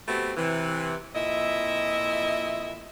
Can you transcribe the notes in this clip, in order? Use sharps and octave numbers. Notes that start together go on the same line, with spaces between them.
A3 B3 C4 F#4 G4
C3 E3
F2 A#2 E4 D#5 E5